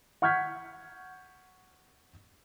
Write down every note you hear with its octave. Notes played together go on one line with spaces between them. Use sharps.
F#5 C#6 F6 G6 G#6 B6